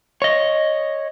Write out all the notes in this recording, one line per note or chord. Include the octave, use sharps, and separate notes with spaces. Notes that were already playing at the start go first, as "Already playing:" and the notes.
C#5 D#5